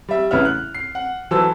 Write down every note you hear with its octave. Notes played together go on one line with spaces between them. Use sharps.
G3 E5
A1 C#3 B3 E4 E5 F6
F#6
C7
F#5
E3 F#3 A3 C5 A5 E6